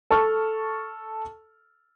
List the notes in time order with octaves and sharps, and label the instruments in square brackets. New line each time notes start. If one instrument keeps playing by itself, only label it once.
[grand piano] A4 A5 C#6 F6